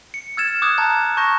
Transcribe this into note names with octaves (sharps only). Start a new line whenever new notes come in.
C#7
E6 F6 G#6 A6 E7
D6 D#6 F#6 G#6
A5 A#5 F#6 G#6
A5 C#6 F#6 G6 A#6